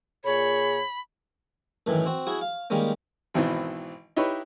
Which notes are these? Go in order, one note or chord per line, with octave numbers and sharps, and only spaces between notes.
A#2 G#4 C#5 B5
F#2 A2 D#3 E3
C4 F#4
E4 F#4 G#4
F5
D#3 G3 G#3 A#3 C#4
G#1 B2 D#3 E3 C4
D#4 E4 G4 B4 C#5